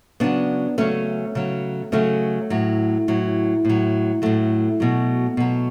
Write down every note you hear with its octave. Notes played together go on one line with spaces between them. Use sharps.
C#3 F#3 B3 D4
C#3 F#3 A3 C#4
C#3 F#3
C#3 F#3 A3 C#4
A2 F#3
A2 F#3
A2 F#3
A2 F#3 A3
B2 F#3
B2 F#3